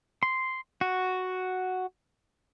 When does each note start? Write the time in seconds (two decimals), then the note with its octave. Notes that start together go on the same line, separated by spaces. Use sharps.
0.23 C6
0.81 F#4